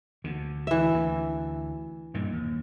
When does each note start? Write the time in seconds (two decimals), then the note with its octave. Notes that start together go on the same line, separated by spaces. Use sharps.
0.24 D2 D3
0.67 E3 E5
0.94 D2
2.14 G2 A#2 D#3
2.33 D#2